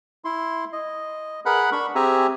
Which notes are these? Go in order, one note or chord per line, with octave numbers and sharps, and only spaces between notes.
E4 C6
D#5
G#4 A#4 B4 F#5 B5 F#6
D4 B5 C#6
C4 G4 G#4 E5 G#5 A#5